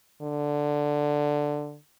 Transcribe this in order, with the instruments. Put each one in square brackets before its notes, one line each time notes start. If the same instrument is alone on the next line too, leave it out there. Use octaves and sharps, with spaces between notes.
[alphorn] D3